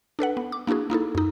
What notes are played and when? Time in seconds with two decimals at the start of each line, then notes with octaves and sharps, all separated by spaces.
0.19 D4 A4 B4 F#5
0.37 B3
0.52 D6
0.67 A#3 D4 E4 F#4 G#4
0.90 A#3 D#4 E4 A4
1.15 F#2 D#4